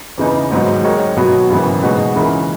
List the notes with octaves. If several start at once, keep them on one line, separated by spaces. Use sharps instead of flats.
E2 C#3 E3 B3 D#4
G#1 G#2 F#3 B3 D#4
D#3 G#3 D#4 A#4 C#5
B2 F#3 B3 F#4
G#1 F#2 C#3 E3 B3
B2 G#3 D#4 F#4 B4
C#2 C#3 E3 A#3